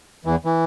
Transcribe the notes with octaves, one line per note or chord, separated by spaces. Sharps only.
E2 E3
E3